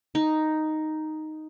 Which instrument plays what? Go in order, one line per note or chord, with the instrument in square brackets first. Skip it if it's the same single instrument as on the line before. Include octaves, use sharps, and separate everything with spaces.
[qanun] D#4